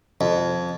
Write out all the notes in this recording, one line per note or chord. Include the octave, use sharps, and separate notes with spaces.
F2